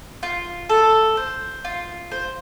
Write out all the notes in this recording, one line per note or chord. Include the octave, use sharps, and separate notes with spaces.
F4
A4
C5
F4
C5